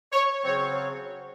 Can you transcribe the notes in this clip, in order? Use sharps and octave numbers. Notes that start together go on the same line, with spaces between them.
C#5
C#3 F#3 C4 C#5